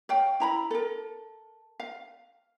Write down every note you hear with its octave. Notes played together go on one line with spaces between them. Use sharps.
C#5 F5 G5
E4 A#5 B5
A4 A#4
F5